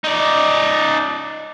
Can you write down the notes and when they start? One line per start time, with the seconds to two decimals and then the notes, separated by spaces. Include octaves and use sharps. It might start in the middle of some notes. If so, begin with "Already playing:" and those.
0.04 D#4 D5